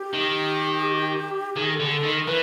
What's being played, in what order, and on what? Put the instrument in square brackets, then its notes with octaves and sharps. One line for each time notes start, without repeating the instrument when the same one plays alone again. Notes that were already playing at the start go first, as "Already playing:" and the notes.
Already playing: [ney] G4
[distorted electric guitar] D#3
[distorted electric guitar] D#3 [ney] G#4
[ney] A4
[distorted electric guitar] D3
[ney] G#4
A4
[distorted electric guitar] D#3
[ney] A#4
[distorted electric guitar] E3 [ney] B4